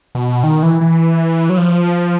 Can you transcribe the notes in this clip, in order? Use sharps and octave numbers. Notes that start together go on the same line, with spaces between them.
B2
D#3
E3
E3
F#3
F3